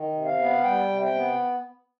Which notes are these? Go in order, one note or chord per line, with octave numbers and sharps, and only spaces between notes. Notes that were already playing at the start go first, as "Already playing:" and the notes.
Already playing: D#3
C3
F5
B3
G3 G5
C3
G5
B3